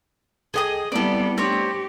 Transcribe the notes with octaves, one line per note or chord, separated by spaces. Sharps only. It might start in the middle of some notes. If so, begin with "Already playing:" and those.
C2 G#4 A4 D#5 G5 D#6
G3 B3 C4 E4 A4 D5
A3 C4 D4 G4 C#5